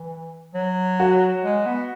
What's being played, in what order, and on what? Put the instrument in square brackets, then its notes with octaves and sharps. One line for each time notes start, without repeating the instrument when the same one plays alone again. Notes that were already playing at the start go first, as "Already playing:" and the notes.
Already playing: [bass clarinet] E3
F#3
[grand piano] F#4
[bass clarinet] G#3
B3